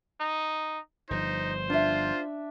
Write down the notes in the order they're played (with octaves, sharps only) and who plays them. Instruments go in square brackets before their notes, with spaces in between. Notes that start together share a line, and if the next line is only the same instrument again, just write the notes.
[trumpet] D#4
[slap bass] G1 F3 [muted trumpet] D#4 [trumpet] C5
[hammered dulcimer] D4 E5 [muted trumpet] F4